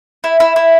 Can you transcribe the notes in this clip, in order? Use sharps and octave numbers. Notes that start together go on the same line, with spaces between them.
E4
E4
E4